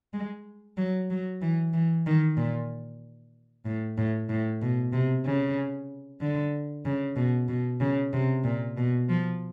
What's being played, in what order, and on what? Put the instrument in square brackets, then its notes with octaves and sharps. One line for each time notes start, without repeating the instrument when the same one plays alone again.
[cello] G#3
F#3
F#3
E3
E3
D#3
A#2
A2
A2
A2
B2
C3
C#3
D3
C#3
B2
B2
C#3
C3
A#2
B2
F3